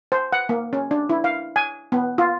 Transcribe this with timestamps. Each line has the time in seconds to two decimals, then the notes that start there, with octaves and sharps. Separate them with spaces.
0.12 C5
0.32 F#5
0.49 A#3
0.73 C#4
0.91 D4
1.09 E4
1.24 F5
1.56 G#5
1.92 B3
2.18 F4